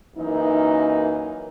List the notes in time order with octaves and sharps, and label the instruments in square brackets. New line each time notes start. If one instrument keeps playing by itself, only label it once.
[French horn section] F#2 E3 A#3 D#4